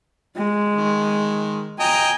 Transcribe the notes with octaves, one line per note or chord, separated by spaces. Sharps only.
G#3
D#3
D#5 G5 G#5 A#5